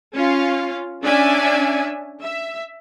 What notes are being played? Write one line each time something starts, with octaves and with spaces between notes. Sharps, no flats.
C#4 F4 F5
C#4 D4 D5 E5 G#5
E5